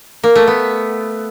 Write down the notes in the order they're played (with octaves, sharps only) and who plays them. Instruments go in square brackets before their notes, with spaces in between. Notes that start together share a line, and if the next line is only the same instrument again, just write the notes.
[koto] A#3
A3
B3